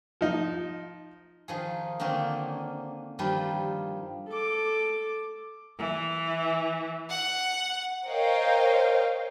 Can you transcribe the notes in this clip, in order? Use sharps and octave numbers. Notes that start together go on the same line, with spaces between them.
F3 D#4
D#3 F3 G#4
D3 D#3 A#3 C4 C#4
G2 D#3 F3 G3
A4 D6
E3
F#5
A#4 C5 C#5 D#5 F5 G5